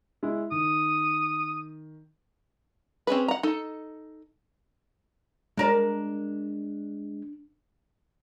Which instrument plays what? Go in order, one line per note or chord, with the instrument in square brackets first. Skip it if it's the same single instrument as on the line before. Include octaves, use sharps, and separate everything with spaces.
[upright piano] G#3 E4
[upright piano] D#3 [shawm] D#6
[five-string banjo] C4 C#4 G#4 B4
F#5 A#5
D#4 A4
[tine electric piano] G#3 [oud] D4 A#4 D5